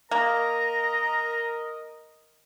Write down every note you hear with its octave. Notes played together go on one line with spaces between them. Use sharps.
A#3 A#4 D#5 A#5